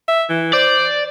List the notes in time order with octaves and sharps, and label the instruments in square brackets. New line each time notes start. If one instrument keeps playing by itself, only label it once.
[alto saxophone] E5
E3
[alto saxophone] C5 [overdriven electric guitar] D5